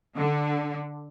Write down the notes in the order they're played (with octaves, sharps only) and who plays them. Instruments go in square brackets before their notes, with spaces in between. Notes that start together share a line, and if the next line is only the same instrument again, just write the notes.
[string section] D3